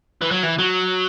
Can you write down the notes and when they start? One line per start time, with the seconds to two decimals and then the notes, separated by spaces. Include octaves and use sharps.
0.21 E3
0.31 F#3
0.43 E3
0.58 F#3